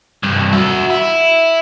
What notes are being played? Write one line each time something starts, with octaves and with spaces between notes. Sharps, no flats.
C2 G2
F#4 E5
E4